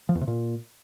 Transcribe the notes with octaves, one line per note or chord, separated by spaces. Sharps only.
F3
E2
C3
A#2